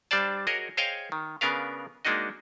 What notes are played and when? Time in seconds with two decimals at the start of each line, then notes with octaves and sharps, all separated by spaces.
0.11 G3 D4 C5 D5 A5
0.47 F#4 G#4 A#4 C#5 D#5
0.77 G#4 C5 C#5 D#5 F5 G5
1.12 D#3
1.41 C#3 B3 D4 A#4 B4 F5
2.05 G#3 A#3 D4 D#4 F#4 D#5